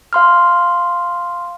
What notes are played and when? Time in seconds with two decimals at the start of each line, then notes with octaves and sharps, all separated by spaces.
0.13 F5 C6 F6